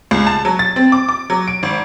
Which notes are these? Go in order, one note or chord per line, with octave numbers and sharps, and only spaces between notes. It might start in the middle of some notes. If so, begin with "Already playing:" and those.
C#2
A5
F#3
A6
C4
D6
D6
F#3
D7
G#1